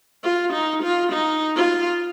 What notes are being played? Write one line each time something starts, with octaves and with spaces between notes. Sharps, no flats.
F4
D#4
F4
D#4
F4